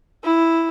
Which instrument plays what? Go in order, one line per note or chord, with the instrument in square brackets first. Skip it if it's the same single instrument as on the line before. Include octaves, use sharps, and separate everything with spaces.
[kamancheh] E4